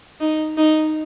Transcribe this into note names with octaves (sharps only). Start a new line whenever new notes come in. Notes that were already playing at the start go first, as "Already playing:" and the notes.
D#4
D#4